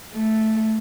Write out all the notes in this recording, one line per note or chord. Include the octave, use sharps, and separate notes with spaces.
A3